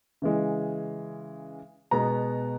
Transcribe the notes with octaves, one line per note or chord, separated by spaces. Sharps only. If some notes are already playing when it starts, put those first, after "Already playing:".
C#3 E3 G#3
B2 G#3 B3 A#5